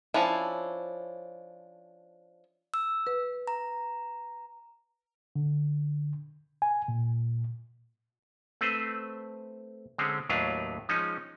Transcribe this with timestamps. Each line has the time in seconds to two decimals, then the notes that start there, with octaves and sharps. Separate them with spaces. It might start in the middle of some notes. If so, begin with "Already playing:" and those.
0.14 F3 C#4 D4 E4
2.74 E6
3.07 B4
3.47 A#5
5.36 D3
6.62 G#5
6.88 A#2
8.61 A3 C4 B4 C5
9.98 D3 G#3 C4 C#4
10.29 D#2 A2 F#3 D4 B4 F5
10.89 F3 G#3 C#4 D#4